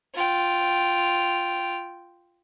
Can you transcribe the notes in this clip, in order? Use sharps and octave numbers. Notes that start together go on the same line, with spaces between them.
F4 G5